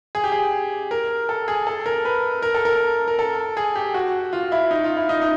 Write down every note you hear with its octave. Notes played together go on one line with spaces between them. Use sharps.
G#4
G4
G#4
A#4
A4
G#4
A4
A#4
B4
A#4
A4
A#4
A#4
A4
G#4
G4
F#4
F4
E4
D#4
F4
E4
D#4
D#4